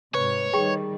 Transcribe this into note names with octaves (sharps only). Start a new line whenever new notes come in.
G#2 C3 B4 C#5
D#3 G3 G#4 G5 C#6